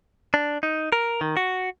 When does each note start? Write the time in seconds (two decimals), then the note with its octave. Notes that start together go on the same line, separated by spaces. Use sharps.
0.34 D4
0.63 D#4
0.92 A#4
1.21 D#3
1.37 F#4